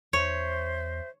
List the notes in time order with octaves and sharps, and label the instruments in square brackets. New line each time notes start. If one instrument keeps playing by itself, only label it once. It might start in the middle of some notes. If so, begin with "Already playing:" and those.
[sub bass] E2 [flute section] C5 E5 [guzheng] C#5